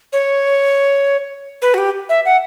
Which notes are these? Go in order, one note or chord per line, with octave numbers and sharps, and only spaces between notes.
C#5
B4
F#4
G4
E5
F#5